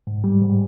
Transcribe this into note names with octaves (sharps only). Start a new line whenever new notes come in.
G#2
G3
G#2